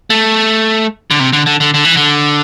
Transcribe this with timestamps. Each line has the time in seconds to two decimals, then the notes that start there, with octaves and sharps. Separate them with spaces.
0.10 A3
1.11 D3
1.20 C3
1.33 D3
1.46 D3
1.60 D3
1.74 D3
1.85 E3
1.97 D3